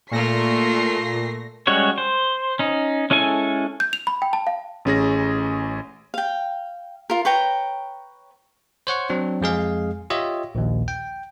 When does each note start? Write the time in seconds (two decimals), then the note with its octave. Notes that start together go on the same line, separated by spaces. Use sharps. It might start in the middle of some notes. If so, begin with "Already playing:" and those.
0.11 A#2 A3 F4 C#6 A#6 C7
1.67 G3 G#3 C#4 F#4 C#5
1.98 C5
2.59 C#4 D#4
3.10 G#3 C#4 E4 A4 G#5
3.80 G6
3.93 F7
4.07 B5
4.22 G5
4.33 A5
4.47 F5
4.85 A1 C#4 G#4 A#6
6.14 F5 G5
7.10 F4 A#4
7.25 B4 C#5 G5 A#5
8.87 C5 C#5 F#5 C#6
9.10 F#3 C4 D4
9.41 F2 G#3 G#4 F5
10.10 F4 G4 C#5 D#5 E5
10.55 A#1 D#2
10.88 G5